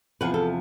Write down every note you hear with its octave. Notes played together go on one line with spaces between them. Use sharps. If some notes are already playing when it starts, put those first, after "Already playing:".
E2 C3 F3 B4
A4